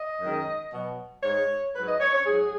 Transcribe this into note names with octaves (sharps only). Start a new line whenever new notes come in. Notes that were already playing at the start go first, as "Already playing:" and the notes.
Already playing: D#5
F#2 D#3 G#3
B2 F#3
G#2 G#3 C#5
G#2 F#3 B4
D#5
C#5
C#5
G#2 F#3 G#4